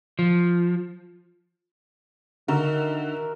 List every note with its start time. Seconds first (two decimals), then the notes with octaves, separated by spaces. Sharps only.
0.19 F3
2.48 D3 D#3 F#4 A#4 E5